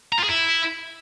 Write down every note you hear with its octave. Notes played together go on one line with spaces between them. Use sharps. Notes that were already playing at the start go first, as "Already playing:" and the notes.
A#5
F4
G#4
E4